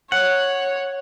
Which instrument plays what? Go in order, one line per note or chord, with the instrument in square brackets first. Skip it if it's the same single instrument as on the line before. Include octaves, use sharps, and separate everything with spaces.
[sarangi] C#5 [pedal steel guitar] F#5